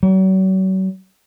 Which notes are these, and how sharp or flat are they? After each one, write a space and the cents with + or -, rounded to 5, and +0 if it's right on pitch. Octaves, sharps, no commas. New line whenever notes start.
F#3 +40